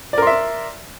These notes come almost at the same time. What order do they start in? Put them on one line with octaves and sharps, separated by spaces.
D5 A#4 C6 E5